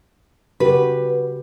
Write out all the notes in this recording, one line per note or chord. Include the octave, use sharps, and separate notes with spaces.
C#3 F#4 G4 B4